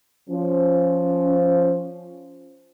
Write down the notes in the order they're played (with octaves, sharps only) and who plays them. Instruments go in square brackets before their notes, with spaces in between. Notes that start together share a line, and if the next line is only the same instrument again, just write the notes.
[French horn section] F3 C#4